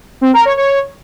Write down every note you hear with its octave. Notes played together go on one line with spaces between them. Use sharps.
C4
A#4
C#5
C#5